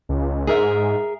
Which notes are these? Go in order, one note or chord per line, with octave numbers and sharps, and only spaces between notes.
C#2
G#2 G#4 A#4 E5